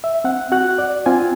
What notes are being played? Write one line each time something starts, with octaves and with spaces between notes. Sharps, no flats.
E5
C4 F#5
F#4 F#5 F#6
D5
C4 F4 G#5